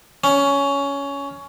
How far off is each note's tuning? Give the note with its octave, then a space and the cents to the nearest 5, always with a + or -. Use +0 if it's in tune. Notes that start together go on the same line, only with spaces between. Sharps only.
C#4 +15